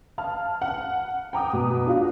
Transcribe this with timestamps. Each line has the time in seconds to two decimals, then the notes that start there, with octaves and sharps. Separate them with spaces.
0.18 F5 A5 F6
0.62 F#5
1.33 G5 A#5 D6 D#6
1.53 B2
1.86 D4 F4 F#4